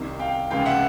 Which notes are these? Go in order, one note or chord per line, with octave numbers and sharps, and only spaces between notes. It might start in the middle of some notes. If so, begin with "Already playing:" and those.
Already playing: C2 C3 D#3
F5 G5
C#2 C3 E3 F5 G5
E5 F#5